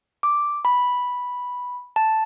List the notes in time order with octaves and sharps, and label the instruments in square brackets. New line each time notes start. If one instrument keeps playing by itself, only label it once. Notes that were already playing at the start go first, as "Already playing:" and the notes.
[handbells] D6
B5
A5